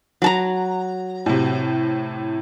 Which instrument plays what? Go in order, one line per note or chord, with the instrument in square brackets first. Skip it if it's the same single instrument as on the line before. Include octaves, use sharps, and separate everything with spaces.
[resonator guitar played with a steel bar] F#3 A5 A#5
[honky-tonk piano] A2 C3